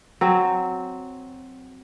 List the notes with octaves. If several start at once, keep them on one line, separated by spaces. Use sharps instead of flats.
F#3 C4